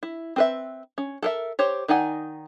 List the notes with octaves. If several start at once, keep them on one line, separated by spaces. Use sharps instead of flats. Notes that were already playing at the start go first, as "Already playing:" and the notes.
E4
C4 B4 E5
C#4
A4 A#4 E5
G4 C5 C#5
D#3 D#4 D5 F#5 G#5